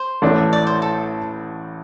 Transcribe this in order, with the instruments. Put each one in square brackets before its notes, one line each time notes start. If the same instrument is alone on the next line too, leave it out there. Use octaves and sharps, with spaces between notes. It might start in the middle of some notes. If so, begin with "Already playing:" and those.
Already playing: [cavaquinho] C5
[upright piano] A1 A2 A3 D4
[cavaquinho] D5
C5
A4